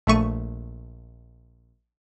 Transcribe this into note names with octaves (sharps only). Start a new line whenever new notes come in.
A#1 A3 C#6 D#7